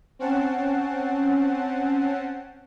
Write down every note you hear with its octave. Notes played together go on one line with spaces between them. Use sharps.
C4 C#4 F#5 A5